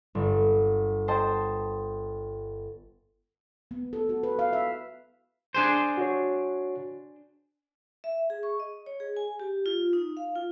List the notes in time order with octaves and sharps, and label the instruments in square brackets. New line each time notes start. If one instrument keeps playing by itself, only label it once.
[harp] G1
C5 D#5 G5 A5
[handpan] B3
A4
F#4
B4
F5
E5
[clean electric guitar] D4 G#4 C5
[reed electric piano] F#4 C#5
[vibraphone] E5
G#4
C#6
D#5
C#5
G#4
G#5
G4
F4
D#4
F5
F4